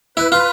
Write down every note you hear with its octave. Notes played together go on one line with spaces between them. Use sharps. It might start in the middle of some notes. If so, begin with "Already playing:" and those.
E4 B4
F4 B4